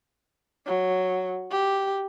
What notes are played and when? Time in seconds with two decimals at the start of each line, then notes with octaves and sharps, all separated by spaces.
0.66 F#3
1.51 G4